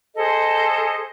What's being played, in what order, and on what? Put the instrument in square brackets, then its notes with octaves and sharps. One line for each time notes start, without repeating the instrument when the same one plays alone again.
[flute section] G#4 A4 C5 D#5